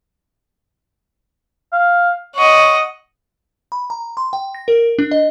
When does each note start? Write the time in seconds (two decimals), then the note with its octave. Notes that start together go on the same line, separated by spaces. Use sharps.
1.73 F5
2.35 C#5 D#5 F#5
3.72 B5
3.90 A#5
4.17 C6
4.33 G5
4.55 A#6
4.68 A#4
4.99 D4
5.11 D#5